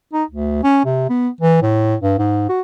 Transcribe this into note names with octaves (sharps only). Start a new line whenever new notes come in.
D#4
D2
C#4
C3
B3
E3
A2
G2
G#2
F#4